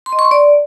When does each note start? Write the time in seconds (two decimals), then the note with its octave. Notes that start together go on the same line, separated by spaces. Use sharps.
0.06 C6
0.12 D#5
0.19 C#6
0.25 C6
0.31 D5